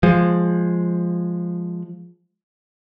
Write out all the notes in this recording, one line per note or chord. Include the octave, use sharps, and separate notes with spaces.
F3 G#3